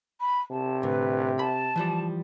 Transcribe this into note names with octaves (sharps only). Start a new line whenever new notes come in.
B5
C3 A5
A2 D3 B4
A5 B5
E3 F3 G3